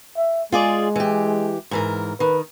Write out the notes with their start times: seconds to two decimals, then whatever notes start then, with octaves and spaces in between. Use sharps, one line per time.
0.17 E5
0.52 G#3 F4 G#4 D5
0.96 E3 G4
1.71 G#2 E3 A#4
2.20 D#3 B4